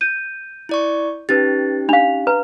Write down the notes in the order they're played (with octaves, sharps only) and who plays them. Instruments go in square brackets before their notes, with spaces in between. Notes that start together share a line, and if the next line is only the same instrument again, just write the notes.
[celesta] G6 D#7
[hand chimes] E4 D5 C#6
[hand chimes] C#4 D#4 G4 [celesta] B4 A6
[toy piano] D4 F5 [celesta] F7
[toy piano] B4 [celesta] A#5